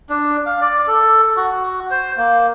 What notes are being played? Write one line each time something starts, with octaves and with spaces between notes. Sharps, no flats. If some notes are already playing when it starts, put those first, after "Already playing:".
D4
F5
D5
A4
F#4
C5
A#3